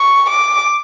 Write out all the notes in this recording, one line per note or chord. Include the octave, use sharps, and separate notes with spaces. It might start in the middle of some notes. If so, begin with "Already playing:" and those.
Already playing: C#6
D6